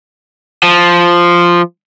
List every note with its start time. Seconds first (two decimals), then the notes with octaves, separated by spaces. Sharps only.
0.63 F3